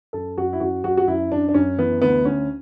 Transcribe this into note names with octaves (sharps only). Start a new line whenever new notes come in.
F#2 A4
F#2 F#4
E4
F#2 F#4
F#2 F#4
F#4
F#2 E4
F#2 D4
D4
F#2 C#4
E3 B3
D2 B3
D2 C#4